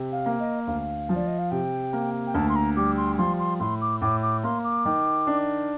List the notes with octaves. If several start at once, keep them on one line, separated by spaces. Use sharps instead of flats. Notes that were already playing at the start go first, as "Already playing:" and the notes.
Already playing: C3
F5
A#3
D#5
D2 F5
F3
D5
D#5
F5
C3 G5
A#3
G5
D2 A5
C6
A#5
G3 D6
C6
F3 C6
C6
A2 C6
D6
A2 D6
D6
A#3 C6
D6
D#3
D4